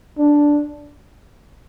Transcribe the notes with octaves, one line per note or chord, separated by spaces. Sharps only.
D4